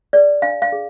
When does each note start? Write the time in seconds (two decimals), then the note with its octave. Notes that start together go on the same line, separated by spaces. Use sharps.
0.13 G#4 B4 D5
0.42 D4 F5
0.62 F5
0.72 G#4